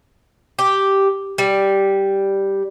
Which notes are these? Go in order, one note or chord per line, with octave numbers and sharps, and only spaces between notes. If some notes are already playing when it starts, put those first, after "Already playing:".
G4
G3